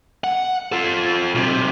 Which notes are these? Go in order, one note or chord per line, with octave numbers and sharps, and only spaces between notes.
F#5
F4 A4
B1 C3